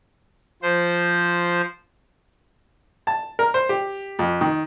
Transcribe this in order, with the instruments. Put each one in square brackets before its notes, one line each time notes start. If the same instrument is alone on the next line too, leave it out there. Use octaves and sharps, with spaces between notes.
[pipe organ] F3 C5
[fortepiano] A5
A#4
C5
G4
F2
D#3